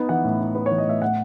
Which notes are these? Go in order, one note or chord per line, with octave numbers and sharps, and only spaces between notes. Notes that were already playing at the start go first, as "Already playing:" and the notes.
Already playing: B3 D#4
E3 F#5
A2
D#4
B3 B4
E3 C#5
D#5
A2 E5
A2 F#5